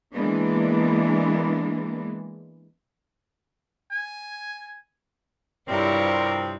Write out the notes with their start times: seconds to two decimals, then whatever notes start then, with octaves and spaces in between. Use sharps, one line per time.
0.13 E3 G#3 A#3 B3 D4
3.92 G#5
5.69 G2 C3 F3 C4 E4 A#4 C#5 D5